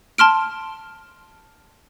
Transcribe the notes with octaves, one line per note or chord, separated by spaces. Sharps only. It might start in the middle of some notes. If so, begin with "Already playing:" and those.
A5 C6 F6 D7